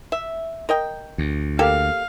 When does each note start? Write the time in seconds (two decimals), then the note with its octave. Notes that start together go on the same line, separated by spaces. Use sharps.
0.12 E5
0.69 A#4 D#5 G5
1.18 D2
1.59 A#3 G4 A4 F5